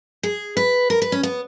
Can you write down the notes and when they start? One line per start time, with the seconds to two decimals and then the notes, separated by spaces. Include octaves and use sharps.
0.23 G#4
0.57 B4
0.90 A#4
1.02 B4
1.12 C#4
1.23 B3